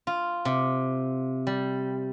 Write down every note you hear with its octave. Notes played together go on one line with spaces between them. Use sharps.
F4
C3
G3